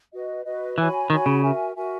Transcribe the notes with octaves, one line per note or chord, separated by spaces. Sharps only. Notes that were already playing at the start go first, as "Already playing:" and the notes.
F#4 B4 D#5
F#4 B4 D#5
E3 F#4 C#5 G#5 B5
D#3 F#4 C#5 G#5 B5
C#3
F#4 A#4 E5 G#5
F#4 A#4 E5 G#5